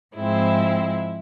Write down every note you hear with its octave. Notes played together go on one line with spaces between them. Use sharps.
G#2 F3 G#3 C4 E4